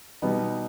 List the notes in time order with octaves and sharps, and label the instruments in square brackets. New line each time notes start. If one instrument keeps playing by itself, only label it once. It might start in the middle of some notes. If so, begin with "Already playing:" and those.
[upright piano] B2 G3 B3 D#4